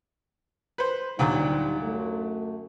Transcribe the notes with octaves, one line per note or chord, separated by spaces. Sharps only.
B4 C5
D2 A#2 F#3 G3 D#4
F#2 A3